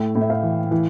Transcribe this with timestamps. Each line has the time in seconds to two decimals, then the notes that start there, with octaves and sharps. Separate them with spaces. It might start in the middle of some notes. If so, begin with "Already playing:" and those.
Already playing: A2 A3 G5
0.15 A2
0.21 E5
0.30 F5
0.43 E3
0.71 E3